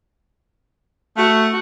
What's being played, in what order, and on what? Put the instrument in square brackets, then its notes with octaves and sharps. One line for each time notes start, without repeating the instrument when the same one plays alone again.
[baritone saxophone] A3 [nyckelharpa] F#4